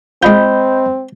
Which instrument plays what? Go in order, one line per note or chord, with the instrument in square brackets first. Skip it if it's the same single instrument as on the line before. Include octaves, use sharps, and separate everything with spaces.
[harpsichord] G#3 F4 [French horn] C4 [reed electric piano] D#5 B5 G6